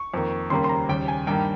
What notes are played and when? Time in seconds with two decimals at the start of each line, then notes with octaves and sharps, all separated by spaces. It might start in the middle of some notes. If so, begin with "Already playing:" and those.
Already playing: C#6
0.14 F2 D#3 A#3
0.50 D#2 C#3 G3 A#3 C6
0.64 C6
0.69 A#5
0.89 D#2 C#3 G3 G5
1.08 G#5
1.27 G2 D#3 G3 A#3 G5